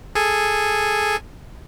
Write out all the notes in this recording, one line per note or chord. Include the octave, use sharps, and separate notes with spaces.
G#4 A4 G#5